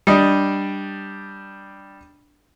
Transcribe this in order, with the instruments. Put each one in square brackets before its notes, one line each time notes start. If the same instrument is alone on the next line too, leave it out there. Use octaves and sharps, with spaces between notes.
[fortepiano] G3 D4 D#5